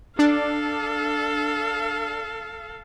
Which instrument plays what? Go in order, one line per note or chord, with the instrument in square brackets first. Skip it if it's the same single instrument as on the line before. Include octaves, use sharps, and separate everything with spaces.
[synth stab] D4 [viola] A4 F5